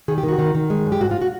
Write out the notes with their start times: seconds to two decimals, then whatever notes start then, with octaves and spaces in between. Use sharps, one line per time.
0.08 D#3 G#4
0.18 G4
0.23 D#3
0.28 F#4
0.39 D#3
0.55 D#3
0.70 G#3
0.85 F#2
0.92 G4
1.01 G#2 F#4
1.11 F4
1.22 F#4